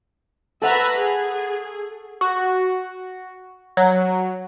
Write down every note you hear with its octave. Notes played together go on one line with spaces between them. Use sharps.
A4 B4 E5 F#5 A#5 C#6
G#4
F#4
F#3